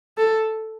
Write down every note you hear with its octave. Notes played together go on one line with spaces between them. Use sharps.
A4